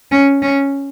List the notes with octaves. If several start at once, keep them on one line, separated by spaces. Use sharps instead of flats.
C#4
C#4